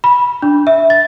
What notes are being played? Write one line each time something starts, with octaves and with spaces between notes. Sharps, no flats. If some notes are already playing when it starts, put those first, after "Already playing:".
B5
D4
E5
A6